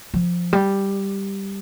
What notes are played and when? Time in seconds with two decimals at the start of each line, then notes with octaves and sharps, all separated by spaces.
0.14 F3
0.53 G3